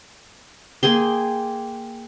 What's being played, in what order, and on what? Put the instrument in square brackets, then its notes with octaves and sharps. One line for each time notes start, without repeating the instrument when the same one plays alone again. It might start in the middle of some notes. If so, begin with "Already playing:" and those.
[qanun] A#3 G#4 G5 C6